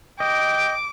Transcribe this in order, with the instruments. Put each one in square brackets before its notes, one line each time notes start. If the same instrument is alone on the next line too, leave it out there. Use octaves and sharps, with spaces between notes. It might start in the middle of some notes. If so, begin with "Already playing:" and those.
[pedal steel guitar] D#5 [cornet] G5 [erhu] D6